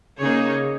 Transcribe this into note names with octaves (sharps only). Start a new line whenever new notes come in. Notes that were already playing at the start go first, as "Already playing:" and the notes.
C#3 A#3 D#4 G#4 C#5